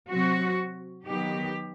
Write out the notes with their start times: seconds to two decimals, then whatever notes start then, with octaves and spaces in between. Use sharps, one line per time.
0.10 C3 F#3 C4 F#4
1.07 D#3 F#3 B3 D#4 G4